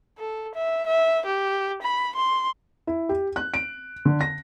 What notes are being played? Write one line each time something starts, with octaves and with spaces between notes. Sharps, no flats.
A4
E5
E5
G4
B5
C6
E4
G4
F#6
D7
D3
A#6